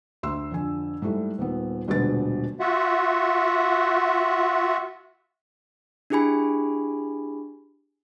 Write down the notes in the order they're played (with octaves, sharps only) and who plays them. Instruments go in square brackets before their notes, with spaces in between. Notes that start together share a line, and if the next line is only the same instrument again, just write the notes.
[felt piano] D2 C6 E6
F2 D3 G#5
G#2 G3 A3 E4
D#1 D#3 B3
D#1 B2 D3 G#3 B4 A6
[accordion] F4 F#4 E5 F#5
[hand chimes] D4 E4 G4 G#4 G#5 B5